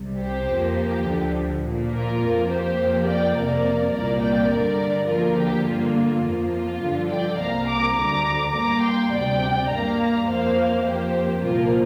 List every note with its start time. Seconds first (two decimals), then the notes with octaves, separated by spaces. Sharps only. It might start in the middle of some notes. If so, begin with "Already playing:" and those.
Already playing: C2 C3 G3
0.18 G4 C5
0.48 F2 F3 A#3
0.77 G4
1.06 D2 D3 F3
1.63 A#2 F3 A#3
1.92 F4 A#4
2.21 F2 F3 A#3
2.49 G4 C5
2.78 F2 F3 A#3
3.07 D5 G5
3.35 F2 C3 A#3 A#4 D5
3.93 C2 A#2 G3 A#3 A#4 D5
4.22 D5 G5
4.51 G2 D3 G3 A#4 D5
5.08 D2 D3 F3 A#3 F4 A#4
5.38 G4
5.67 G2 D3 A#3 F4
5.96 F4
6.24 F2 F3 A#3
6.53 F4
6.82 G2 D3 F3
7.10 D5 G5
7.39 C2 C3 A#3 F5 A#5
7.68 A#5 D6
7.97 D2 D3 G3 A#5 D6
8.55 G2 G3 A#3 A#5 D6
8.83 G5 C6
9.12 D2 C3 G3 D5 G5
9.70 G2 G3 A#3 F5 A#5
10.28 F2 F3 A#3 C5 F5
10.85 F2 F3 A#3 G4 C5
11.43 C2 A#2 F3 A#3 F4 A#4